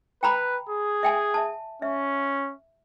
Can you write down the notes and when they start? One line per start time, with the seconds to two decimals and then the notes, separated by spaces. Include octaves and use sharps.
0.23 B4 G5 A#5 B5
0.70 G#4
1.03 E5 G5 G#5
1.34 E5 A5
1.82 C#4 E5